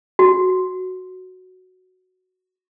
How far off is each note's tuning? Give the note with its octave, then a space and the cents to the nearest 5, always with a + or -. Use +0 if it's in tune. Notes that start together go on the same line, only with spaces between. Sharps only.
F#4 +0